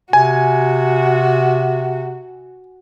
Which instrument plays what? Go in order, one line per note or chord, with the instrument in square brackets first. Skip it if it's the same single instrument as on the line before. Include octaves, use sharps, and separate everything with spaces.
[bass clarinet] C3 [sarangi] F#4 [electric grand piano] G#5